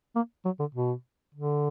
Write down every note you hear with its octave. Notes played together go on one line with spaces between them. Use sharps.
A#3
F#3
D3
B2
D3